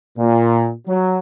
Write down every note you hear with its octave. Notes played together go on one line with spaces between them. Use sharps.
A#2
F#3